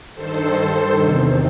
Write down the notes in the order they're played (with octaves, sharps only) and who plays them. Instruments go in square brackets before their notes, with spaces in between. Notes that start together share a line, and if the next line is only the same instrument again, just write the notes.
[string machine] G2 D#3 A4 C5
E2 C3 D#3